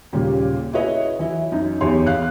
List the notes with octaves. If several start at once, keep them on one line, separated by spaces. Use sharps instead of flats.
D#2 A#2 C#3 G3
E4 F#4 G#4 B4 C#5 D#5
E3 F#3 E4
F#2 D#4
E2 D#4 G4 C#5 C6
E2 F5 F#6